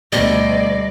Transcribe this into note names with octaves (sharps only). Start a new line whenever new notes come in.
D2 B2 G3 A3 D5 D#5